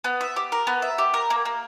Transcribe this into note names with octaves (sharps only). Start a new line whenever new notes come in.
B3
E5
G4
A#4
B3
E5
G4
A#4
A#3
A#3